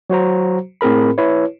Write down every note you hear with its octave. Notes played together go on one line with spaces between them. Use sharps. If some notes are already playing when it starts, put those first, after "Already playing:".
F#3 F#4 C5 A#5
A2 C4 G#4 A#4 B5
E4 B4 C#5